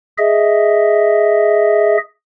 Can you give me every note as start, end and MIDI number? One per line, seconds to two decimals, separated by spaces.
0.18 1.97 68
0.18 1.97 75
0.18 1.97 76